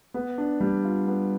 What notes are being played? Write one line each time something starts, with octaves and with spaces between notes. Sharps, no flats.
B3
D4
G3
F4
B3